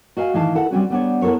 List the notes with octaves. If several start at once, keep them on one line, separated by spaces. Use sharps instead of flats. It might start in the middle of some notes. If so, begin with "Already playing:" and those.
F#4 D#5 F5 G#5
A2 D#3 E3 D#5 F5 A5
E4 A4 F#5
G3 C4 C#4 F#4
G3 B3 D4 C#5
B3 E4 A4 A#4 C#5